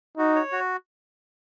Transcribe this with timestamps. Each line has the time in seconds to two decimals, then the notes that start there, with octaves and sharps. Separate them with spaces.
0.17 D#4 F#4
0.35 C#5
0.52 F#4